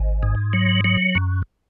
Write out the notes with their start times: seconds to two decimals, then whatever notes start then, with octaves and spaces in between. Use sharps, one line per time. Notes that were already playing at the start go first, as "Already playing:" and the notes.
Already playing: G#1
0.23 G#2
0.53 F#3
0.84 F#3
1.15 F#2